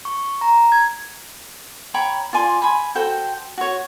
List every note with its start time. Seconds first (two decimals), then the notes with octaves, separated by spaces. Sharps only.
0.05 C#6
0.41 A#5
0.72 G#6
1.94 C#5 G5 A#5 B5
2.33 F4 D5 G#5 C6
2.62 G#5 B5
2.95 F#4 A4 C5 G5
3.58 F#4 C#5